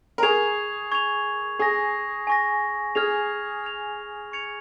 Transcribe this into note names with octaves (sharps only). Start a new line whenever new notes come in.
A#4
G#4 C#6 G#6 F7
C#6 G#6 F7
G#4 G#5 C#6 A#6
G#5 C#6 A#6
G#4 F6 G#6 F7
F6 G#6 F7
C#6 G#6 C#7 F7